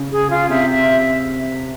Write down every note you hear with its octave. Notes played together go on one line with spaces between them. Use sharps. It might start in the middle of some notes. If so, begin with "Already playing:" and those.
Already playing: C#3
G#4
F4
C3 E5
E5